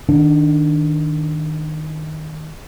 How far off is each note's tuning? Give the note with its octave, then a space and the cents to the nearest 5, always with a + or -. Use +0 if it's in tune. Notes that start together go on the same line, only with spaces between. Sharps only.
D#3 +0 D4 +0